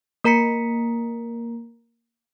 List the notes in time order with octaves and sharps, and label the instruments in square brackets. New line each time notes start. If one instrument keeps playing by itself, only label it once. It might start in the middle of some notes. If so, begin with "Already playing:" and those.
[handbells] A#3 A#4 A#5 B6 C#7